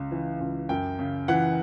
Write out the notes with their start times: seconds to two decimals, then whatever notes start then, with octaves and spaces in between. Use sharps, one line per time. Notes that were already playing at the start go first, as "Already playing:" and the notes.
Already playing: C#2 C#3
0.11 E3
0.40 C#2
0.69 F#2 G5
0.99 C#3
1.28 E3 F#5